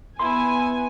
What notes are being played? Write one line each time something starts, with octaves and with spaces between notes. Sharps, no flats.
B3 E4 G#5 C6